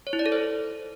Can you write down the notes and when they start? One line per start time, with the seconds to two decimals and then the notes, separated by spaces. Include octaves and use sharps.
0.07 C#5
0.13 E4
0.19 D5
0.26 A4
0.32 C5